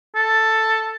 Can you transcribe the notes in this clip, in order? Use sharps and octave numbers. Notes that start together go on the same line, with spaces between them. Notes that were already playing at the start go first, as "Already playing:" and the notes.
A4